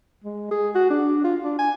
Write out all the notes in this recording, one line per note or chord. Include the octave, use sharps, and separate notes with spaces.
G#3
G#4
F#4
D4
F4
D4
G#5